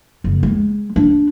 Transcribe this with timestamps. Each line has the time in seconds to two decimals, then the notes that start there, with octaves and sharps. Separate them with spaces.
0.24 F#1
0.43 G#3
0.96 D4